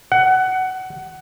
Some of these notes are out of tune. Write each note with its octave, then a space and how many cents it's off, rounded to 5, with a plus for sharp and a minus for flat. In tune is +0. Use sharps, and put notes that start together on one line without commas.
F#5 +20